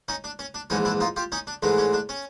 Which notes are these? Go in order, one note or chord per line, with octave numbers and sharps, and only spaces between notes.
C#4 D#4
D4
C#4
D4
A#1 G#2 E3 C#4 D#4
D4 E4
D#4 F4
F4 G4
C#4 D#4
D4
A1 G#2 E3 G#3 D4
C#4
D4
C#4